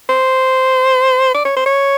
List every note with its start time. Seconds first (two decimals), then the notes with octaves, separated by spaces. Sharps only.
0.09 C5
1.34 D5
1.45 C#5
1.57 C5
1.66 C#5